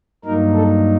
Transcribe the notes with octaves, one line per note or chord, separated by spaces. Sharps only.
G2 F#3 A#3 D#4 A#4
A4